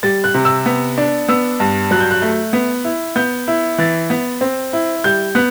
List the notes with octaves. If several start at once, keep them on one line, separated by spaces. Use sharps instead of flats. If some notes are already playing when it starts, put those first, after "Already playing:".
G3 A6
F#6
C3
E6
B3
D4
B3 E6
G2
F#3 F#6
G6
F#6
A3
B3
E4
B3 G6
E4
E3 A6
B3
C4
E4
G3 G6
B3 F#6